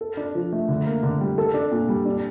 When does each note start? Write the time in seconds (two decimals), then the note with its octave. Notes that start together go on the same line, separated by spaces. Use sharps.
0.01 A4
0.17 D4
0.35 F3
0.53 A3
0.68 D3
0.86 A#3
1.03 D3
1.21 G3
1.38 A4
1.54 D4
1.71 A#2
1.89 G3
2.05 D4